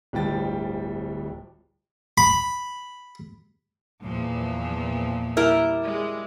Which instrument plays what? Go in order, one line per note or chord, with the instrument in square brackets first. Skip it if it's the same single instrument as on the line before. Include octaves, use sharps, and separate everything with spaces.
[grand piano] D1 G1 F3 G3 G5 A6
[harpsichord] B5
[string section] E2 A#2 F3
[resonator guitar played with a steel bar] G3 E4 A#4
[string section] G#3